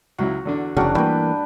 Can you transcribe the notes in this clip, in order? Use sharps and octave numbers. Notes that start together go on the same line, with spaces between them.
C#2 F#3 E4 F#4
E2 D3 D4
F1 E2 C#3 D4 F#4 A#4 F#5 G5
G2 E3 A3 A#3 B4 G5